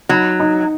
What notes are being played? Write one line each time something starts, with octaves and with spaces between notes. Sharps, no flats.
F#3 D#4
D#4